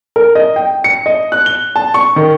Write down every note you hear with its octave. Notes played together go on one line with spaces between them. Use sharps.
A#4
D#5
G5
C#7
D#5
F#6
G7
A5
C#6
D#3